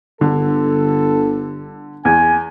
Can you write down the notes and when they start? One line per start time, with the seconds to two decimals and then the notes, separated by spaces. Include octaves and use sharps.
0.21 G1 D3 A4
2.05 E2 G#5